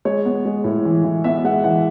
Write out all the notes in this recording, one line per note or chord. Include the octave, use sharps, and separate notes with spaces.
G#3 C#5
B3
G#3
A2
E3
E3
B3 E5
G#3 F#5
E3 F#5